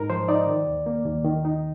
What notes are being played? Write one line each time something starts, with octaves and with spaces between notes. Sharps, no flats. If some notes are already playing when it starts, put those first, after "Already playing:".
Already playing: G#2 D#4 A#4
F3 C5
D#4 D5
D#3
D#2
A#3
D#2
D#3
D#4